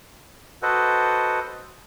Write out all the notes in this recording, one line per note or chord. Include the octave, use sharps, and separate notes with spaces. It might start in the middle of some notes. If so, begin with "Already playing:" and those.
F#4 A4 B4 C5 D#5 F#5